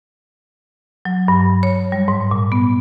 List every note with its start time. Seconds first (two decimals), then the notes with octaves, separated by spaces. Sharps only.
1.05 F#3
1.28 G2
1.63 C#5
1.92 G3
2.08 G#2
2.31 A#2
2.52 B3